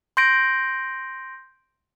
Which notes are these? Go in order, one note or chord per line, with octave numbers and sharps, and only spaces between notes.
C6 G6 A#6 D7